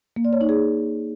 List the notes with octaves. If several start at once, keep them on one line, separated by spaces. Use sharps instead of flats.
A#3
D5
C#5
D#4
G#4